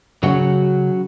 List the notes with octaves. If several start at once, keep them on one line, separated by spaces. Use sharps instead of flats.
C#3 F#3 F#4 C#5